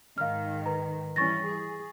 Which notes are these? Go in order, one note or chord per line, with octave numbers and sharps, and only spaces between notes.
G#2 D#3 F5 F6
B4 A#5
E3 G3 C#4 C#6 A6 A#6
G#4